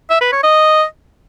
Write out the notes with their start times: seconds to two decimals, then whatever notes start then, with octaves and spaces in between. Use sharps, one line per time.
0.10 E5
0.21 B4
0.32 C#5
0.43 D#5